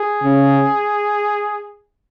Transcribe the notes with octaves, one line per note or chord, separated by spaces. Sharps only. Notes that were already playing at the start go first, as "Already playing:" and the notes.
Already playing: G#4
C#3